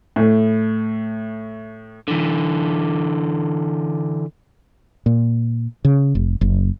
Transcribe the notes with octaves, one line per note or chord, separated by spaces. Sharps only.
A2 A3
D3 E3
A#2
C#3
F1
F#1